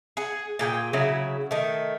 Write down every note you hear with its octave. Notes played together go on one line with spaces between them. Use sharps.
G#4 F#5
A#2 G#4 G5
C#3 F#3 E4
D#3 A3